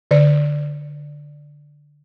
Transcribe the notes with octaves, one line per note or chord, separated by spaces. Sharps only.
D3 D5